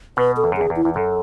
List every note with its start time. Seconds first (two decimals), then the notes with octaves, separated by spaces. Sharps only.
0.17 B2 B4
0.37 A4
0.44 E2
0.52 F#2
0.57 E2 G#4
0.70 E2
0.76 E4
0.85 E2
0.96 F#2 A4